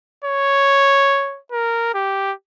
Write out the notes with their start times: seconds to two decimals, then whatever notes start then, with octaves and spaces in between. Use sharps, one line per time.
0.25 C#5
1.52 A#4
1.94 G4